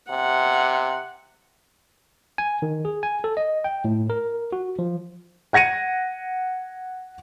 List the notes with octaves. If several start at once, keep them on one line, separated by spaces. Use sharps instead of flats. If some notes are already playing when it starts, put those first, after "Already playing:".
C3 F#5
G#5
D#3
G#4
G#5
A4
D#5
G5
A2
A#4
F#4
F3
F#5 G#6 A#6 C#7 D#7